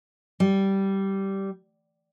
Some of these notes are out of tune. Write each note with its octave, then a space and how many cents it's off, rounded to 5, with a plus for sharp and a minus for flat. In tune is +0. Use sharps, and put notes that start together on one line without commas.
G3 -10